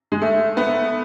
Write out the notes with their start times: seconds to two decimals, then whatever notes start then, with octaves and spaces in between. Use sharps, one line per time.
0.12 G#3
0.22 A3
0.57 B3